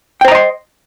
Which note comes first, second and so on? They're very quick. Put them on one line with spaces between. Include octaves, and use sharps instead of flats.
G5 C5 A#5 D#5 C6